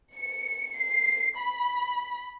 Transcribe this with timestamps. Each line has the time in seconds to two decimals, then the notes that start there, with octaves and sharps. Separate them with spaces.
0.14 C#7
0.76 C7
1.38 B5